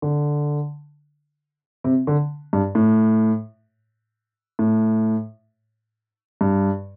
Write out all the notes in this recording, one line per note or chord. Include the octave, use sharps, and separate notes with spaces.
D3
C3
D3
G2
A2
A2
G2